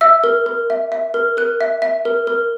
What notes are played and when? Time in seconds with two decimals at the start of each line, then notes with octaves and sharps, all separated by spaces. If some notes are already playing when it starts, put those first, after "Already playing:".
0.01 E5 E6
0.24 A#4
0.46 A#4
0.70 E5
0.92 E5
1.14 A#4
1.37 A#4 F#6
1.61 E5
1.82 E5
2.05 A#4
2.27 A#4